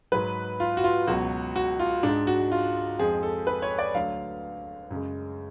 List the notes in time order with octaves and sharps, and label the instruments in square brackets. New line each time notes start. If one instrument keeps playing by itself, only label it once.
[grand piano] G#2 F#3 B4
F4
F#4
F4
C#2 B2 F#3 F#4
F#4
F4
G#2 G#3 D4
F#4
F4
F2 F3 G#3 G#4
A4
B4
C#5
D5
D2 D3 F#3 F5
F#2 C#3 G#3